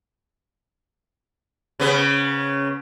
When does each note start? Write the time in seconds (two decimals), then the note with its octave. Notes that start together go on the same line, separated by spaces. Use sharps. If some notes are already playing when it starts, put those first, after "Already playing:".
1.80 C#3 B3